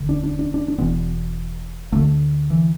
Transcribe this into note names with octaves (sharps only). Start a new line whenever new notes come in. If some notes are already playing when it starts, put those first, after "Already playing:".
Already playing: E1 D2 D3
D4
D4
D4
D4
D4
E1 E2 B2 B3
D2 D3 A3
E3